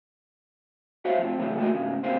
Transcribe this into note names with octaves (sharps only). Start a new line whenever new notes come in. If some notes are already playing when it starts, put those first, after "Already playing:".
F#4 C5 C#5 E5 F5
C3 F3
F#2 A2 C#3 E3 F#3 G#3
A3 A#3 F#4 D#5
G#2 C#3
D2 A#2 C4 G4 C5 F5